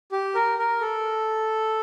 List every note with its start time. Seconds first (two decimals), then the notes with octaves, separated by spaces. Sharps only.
0.12 G4
0.35 A#4
0.58 A#4
0.81 A4